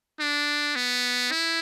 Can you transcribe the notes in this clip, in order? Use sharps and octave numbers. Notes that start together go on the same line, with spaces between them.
D4
B3
E4